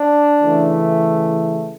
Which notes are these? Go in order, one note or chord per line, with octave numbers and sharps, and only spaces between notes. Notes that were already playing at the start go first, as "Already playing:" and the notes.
Already playing: D4
C#3 E3 A3